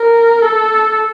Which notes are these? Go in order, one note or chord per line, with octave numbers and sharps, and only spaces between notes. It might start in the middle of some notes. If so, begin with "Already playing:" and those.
Already playing: A#4
A4